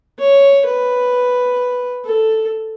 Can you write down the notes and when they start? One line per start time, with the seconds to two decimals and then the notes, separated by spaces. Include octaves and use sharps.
0.19 C#5
0.66 B4
2.06 A4